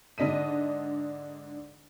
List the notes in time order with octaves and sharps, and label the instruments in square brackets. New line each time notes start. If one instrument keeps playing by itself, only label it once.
[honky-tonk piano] G#2 D3 D4 D#5 B6 D#7